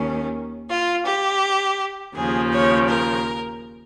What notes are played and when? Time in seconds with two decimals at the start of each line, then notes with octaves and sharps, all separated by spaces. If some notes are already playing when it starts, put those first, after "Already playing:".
Already playing: D#2 D#3 C#4
0.70 F4
1.06 G4
2.15 D#2 C#3 F3 G#4
2.52 C#5
2.87 A#4